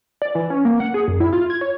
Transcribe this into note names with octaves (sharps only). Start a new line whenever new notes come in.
D5
E3
C#4
A#3
F#5
G#4
F#2
E4
F4
G#6
C#5